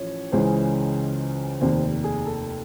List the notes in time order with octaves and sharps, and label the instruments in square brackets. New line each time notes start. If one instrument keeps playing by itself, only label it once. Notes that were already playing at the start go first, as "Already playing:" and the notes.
Already playing: [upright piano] A1 F3 C#5
C#2 C#3 E3 G#3 C#4 C5
F1 D#2 D#3 C5
G#4
A4